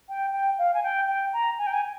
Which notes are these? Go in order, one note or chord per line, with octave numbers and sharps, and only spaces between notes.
G5
G5
F5
G#5
G5
G5
A#5
G#5
G5
G#5